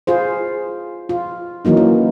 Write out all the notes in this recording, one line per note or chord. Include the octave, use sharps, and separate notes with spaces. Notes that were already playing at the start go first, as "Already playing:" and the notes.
F4 G#4 C5
F4
D#3 E3 F#3 A#3 D#4
C#4